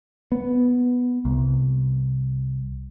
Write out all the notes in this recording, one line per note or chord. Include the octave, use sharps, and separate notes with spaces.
B3
C2